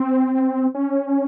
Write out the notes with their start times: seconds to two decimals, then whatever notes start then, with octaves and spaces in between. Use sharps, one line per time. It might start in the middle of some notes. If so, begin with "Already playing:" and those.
Already playing: C4
0.75 C#4